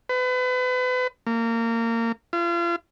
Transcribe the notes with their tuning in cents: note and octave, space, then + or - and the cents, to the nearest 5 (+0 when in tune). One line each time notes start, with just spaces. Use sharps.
B4 +35
A#3 -25
F4 -35